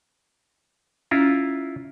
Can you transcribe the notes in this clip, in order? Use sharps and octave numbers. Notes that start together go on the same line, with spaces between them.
C#4 E4 F4